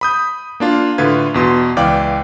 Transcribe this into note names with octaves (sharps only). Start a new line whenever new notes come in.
B5 D#6 G6
A#3 D4 F4
A2 D3 F4 B4 G#6
E2 B2 C6
C#2 E3 D5 F5 G5 D6